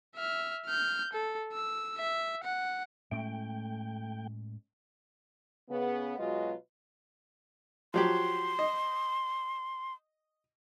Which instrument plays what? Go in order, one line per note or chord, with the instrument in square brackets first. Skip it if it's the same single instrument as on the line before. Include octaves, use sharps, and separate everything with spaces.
[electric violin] E5 F6
F6 G6
A4
E6
E5
F#5
[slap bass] A2 G#3 C#4 [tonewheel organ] A3 G5
[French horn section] C#3 B3
B2 F#3 G#3 F4 B4 D#5
[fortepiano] F3 F#3 G4 [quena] C6
[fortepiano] D#5